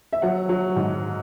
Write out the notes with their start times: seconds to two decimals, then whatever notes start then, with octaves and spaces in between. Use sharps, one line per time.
0.13 E5
0.22 F#3 F#5
0.49 F#3
0.76 G#2